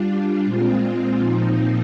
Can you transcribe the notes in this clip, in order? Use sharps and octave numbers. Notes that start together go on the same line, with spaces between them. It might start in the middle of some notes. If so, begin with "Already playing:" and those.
Already playing: G3 D4 F4
A#2 G#3 C4 F4
A#2 F3 C4 D#4